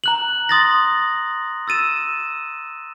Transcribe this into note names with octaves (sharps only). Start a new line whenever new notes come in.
A#5 F#6 F#7
C6 D#6 A6 A#6
E6 A6 D#7 E7